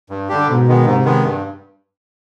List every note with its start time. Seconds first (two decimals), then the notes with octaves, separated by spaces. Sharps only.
0.10 G2
0.29 D3 G3 D4 G4
0.49 G#2 B2
0.67 D#3 G#3 B3
0.85 G#2 C3
1.05 D#3 G#3 B3
1.24 G2